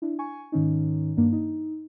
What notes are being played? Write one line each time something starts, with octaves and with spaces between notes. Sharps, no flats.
D4 E4
G#5 C#6
G#2 D#3 C#4 D#4
G2 A#3 D4
D#4